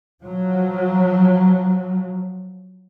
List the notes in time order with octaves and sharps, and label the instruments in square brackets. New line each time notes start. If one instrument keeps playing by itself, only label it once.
[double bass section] F3 F#3